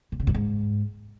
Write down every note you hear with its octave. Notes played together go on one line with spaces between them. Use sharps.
A#2
C#3
F#2
G#2